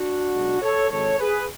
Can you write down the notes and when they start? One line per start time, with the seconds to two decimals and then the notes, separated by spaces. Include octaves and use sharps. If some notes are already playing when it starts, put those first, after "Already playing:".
Already playing: D4 F#4
0.33 B1 B2 G#3
0.62 A4 C#5
0.91 G#1 G#2 G#3 A4 C#5
1.20 G#4 B4